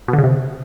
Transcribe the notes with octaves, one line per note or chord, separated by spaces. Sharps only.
B2
D3
C#3
C3